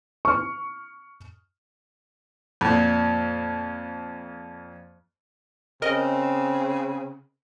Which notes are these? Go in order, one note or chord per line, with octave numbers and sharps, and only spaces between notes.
C#6 F6
F2 A#2
C#3 C4 A#4 D#5